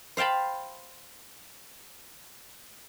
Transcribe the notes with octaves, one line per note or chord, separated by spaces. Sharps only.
C5 F5 G5 A5 B5